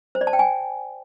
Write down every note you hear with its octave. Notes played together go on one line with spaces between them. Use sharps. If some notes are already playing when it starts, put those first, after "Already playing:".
C5
D5
A5
G5
G#5